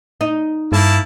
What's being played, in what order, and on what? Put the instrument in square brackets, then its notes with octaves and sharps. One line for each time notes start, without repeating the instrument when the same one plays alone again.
[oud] D#4
[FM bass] G2 [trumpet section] A#3 E4 A5